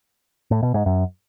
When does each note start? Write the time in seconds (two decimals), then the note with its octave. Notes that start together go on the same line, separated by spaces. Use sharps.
0.51 A2
0.63 B2
0.74 G#2
0.86 F#2